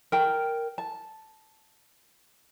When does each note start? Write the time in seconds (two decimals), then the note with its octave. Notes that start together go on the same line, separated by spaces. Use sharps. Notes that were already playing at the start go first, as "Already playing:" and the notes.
0.12 A#4 G5
0.78 A5